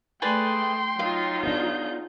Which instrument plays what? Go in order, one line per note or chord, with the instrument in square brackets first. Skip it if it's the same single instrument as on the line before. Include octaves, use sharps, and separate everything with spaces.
[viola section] A3 [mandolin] G#4 B4 D5 [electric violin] G5 C6
[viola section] F#3 D#4 F4 [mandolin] F5
[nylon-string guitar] B3 D4 [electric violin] G#4 G6